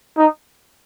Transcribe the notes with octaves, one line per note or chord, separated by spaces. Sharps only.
D#4